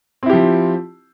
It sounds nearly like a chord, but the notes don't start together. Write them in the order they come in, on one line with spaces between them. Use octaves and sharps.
C4 E4 G4 F3